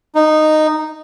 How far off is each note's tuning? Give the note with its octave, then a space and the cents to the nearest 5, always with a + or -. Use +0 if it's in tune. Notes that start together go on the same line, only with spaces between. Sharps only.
D#4 -10